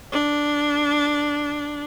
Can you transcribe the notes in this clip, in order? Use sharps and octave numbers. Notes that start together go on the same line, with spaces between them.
D4